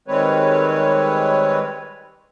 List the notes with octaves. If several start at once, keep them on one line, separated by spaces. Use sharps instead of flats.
D#3 G3 G#3 C4 B4 C#5